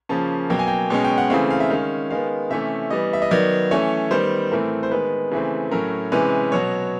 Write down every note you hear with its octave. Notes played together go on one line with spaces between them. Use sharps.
C#3 F3 A#3 C#4 A5
B2 F#3 A#3 G5
G#5
G5
B2 G#3 C#4
G5
F#5
C#3 E3 A3 C4 F5
F5
E5
D#3 G#3 C#4 F5
D#3 G#3 B3 F5
C3 E3 A3 C#4 E5
E3 G3 B3 D#5
E5
D#5
D#3 F#3 B3 D5
E3 A3 C#4 C#5
D#3 G3 B3 C5
A2 E3 A3 C4 A#4
C5
D#3 G#3 B3 B4
C#3 E3 A3 C4
A2 F#3 A3 C#4 A#4
C3 E3 G#3 C#4 B4
B2 F#3 B3 C#5